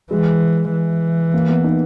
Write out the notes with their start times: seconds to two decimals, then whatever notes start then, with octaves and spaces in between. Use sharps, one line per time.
0.11 E3 G#3
0.72 E3
1.34 A#3
1.49 B3
1.64 D#4